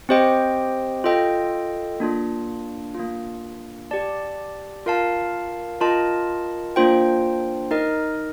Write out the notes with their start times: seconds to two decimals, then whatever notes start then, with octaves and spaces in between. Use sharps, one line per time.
0.09 C4 G4 C5 D#5 G5
1.04 F4 A4 D#5 G5
2.00 A#3 D4 F4
2.95 A#3 D4 F4
3.91 G4 D5 A5
4.86 F4 A#4 F5 A5
5.80 F4 A#4 D#5 A5
6.76 A#3 D4 F4 C5 G5
7.71 D#4 A#4 D#5